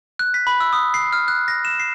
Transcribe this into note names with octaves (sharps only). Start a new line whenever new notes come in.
F#6
B6
B5
E6
D#6
C7
F6
F#6
A#6
E7
C7